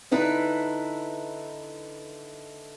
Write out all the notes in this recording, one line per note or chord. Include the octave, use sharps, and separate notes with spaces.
D3 D#4 E4 B4